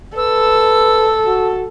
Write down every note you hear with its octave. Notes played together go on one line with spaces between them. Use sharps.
A4 B4 E6
F#4